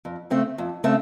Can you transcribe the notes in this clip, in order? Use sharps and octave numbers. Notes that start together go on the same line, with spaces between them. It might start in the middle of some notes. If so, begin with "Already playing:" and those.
F2
C#3 A3 C4
F2
C#3 A3 C4